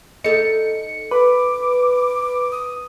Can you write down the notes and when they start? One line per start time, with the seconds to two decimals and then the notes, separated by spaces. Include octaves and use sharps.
0.24 D#4 A4 C#7
1.11 B4 D6
2.52 D#6